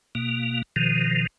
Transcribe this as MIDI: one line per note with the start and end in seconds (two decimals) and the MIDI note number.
0.15 0.62 47
0.15 0.62 58
0.76 1.27 47
0.76 1.27 51
0.76 1.27 53